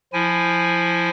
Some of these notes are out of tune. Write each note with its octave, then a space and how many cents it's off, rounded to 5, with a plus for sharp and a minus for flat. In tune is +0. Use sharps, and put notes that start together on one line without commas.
F3 +0 E4 +15 G#5 +0